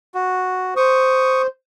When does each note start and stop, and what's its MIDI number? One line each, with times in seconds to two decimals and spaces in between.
0.14 0.74 66
0.77 1.47 72
0.77 1.42 85
0.77 1.42 87